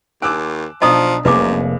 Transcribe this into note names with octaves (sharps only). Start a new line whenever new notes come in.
D#2 G#5 A5 D6 E6 F#6
B1 F3 D4 D#5 A5 A#5 D#6
F1 C2 F#2 A#3 G#4 B4 D6